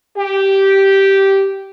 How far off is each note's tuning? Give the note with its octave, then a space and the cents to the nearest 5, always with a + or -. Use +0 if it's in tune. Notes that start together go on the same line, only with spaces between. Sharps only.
G4 -10